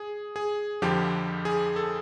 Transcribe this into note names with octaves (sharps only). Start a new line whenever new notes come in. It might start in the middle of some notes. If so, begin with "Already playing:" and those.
Already playing: G#4
G#4
F2 D3 F3 G4
G#4
A4